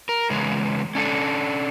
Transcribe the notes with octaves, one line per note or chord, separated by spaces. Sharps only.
A#4
E2 C#3 G#3 B4
C#4 D4 A4